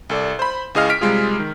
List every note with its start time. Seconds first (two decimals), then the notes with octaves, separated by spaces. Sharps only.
0.10 C2 A4 D5
0.39 C5 B5
0.75 C#2 E4 G#4 D#5 F5 F6
0.90 F6 B6 D7
1.01 C3 G3 G#3 F4 G#4
1.39 D#3